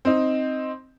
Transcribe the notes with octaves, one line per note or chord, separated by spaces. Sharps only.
C4 D#4